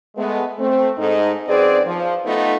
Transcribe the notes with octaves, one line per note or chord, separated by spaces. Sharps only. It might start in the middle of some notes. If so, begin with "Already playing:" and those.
G#3 A3 B3
A3 C4
G#2 D#4 A4
F#2 C4 D#4 G#4 B4 D5
F3
A3 B3 D#4 F4 A4